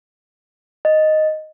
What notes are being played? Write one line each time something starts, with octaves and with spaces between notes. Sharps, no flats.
D#5